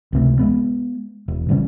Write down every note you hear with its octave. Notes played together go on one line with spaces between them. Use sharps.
C#2 C3 A3
G#3 A3 B3
E1
A1 C#3 G3 C#4